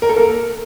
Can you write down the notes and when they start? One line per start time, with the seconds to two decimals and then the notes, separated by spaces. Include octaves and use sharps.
0.02 A#4
0.09 A4
0.16 A#3 A#4